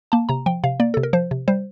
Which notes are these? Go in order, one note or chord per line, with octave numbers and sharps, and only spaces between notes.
A#3 A5
C3 A#5
F3 G5
C3 F5
A#3 D5
C3 A4
A#4
F3 C5
C3
G3 C5